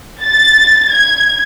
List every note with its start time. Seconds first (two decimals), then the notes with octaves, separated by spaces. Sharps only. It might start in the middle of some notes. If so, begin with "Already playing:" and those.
0.21 A6
0.91 G#6